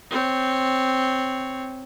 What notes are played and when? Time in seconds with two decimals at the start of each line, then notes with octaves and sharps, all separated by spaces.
0.10 C4 C#5